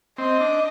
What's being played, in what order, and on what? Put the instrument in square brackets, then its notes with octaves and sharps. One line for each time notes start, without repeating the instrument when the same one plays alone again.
[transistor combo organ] C4 [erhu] D#5
[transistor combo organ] D4